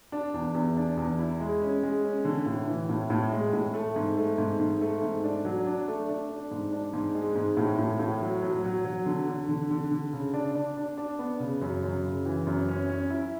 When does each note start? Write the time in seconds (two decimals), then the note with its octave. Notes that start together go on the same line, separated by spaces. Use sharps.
0.12 D4
0.34 E2
0.54 E2
0.77 D4
0.97 E2
1.19 E4
1.40 G#3
1.62 C#4
1.83 G#3
2.04 C#4
2.25 D3
2.46 A2
2.67 E3
2.89 A2
3.10 A2
3.32 G#3
3.53 A2
3.74 A3
3.96 G#2
4.17 A3
4.38 G#2
4.60 G#2
4.81 A3
5.02 G#2
5.24 D4
5.45 F#3
5.66 D4
5.88 A3
6.09 D4
6.29 D4
6.51 G#2
6.73 D4
6.93 G#2
7.15 G#3
7.36 G#2
7.57 A2
7.79 A2
8.00 A2
8.21 F#3
8.42 F#3
8.65 F#3
8.85 F#3
9.06 D3
9.28 D3
9.49 D3
9.71 D3
9.91 D3
10.13 C#3
10.34 D4
10.55 D4
10.77 D4
10.97 D4
11.19 B3
11.40 C#3
11.61 F#2
11.84 F#2
12.04 C#3
12.26 E3
12.47 F#2
12.69 C#4
12.89 C#4
13.10 E4